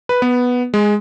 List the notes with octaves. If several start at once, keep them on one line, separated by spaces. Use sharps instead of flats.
B4
B3
G#3